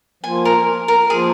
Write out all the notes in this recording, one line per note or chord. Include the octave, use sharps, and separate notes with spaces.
F3 A#3 F4 G#5
A#4
A#4
F3 A#3 F4 G#4